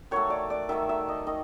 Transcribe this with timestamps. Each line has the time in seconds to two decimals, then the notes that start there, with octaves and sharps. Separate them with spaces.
0.11 D#3 F#3 A3 C#5
0.30 D5
0.50 D5
0.69 D#3 F#3 A3 E5
0.89 E5
1.09 D#5
1.27 D#3 D#5